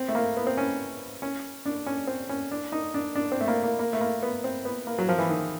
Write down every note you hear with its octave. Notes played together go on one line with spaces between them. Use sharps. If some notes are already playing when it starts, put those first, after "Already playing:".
Already playing: C4
A3
A#3
B3
C4
C#4
C#4
D4
C#4
C4
C#4
D4
D#4
D4
D4
C4
A3
A#3
A#3
A#3
A3
A#3
B3
C4
B3
A#3
F#3
F3
E3
D#3